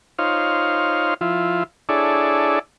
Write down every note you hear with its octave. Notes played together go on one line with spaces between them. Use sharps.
D#4 F4 C5 C#5 F5
F3 E4 F4
D4 E4 G#4 A4 C#5 D5